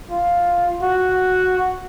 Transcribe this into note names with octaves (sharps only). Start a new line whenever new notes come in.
F4
F#4